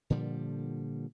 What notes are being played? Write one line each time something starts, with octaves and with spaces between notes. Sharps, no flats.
A#2 D3 F3 G3